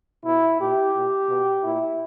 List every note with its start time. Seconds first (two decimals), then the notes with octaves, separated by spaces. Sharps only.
0.24 B2 E4
0.60 A#2 G4
0.95 A#2
1.29 B2
1.64 A#2 E4